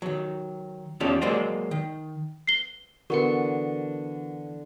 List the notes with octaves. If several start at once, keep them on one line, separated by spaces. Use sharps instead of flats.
D#3 F#3
E2 C#4 D#4 F4 G4 A4
F#3 G#3 A#3 C5 D5 D#5
D#3
C7 G7
D3 E3 B3 F#4 A#4 C6 C#6 C#7